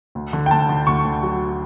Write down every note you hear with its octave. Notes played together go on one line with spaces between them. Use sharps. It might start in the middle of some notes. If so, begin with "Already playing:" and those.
D2
D3
G5
D2 A5
D3
D2 C#6
D2
F#3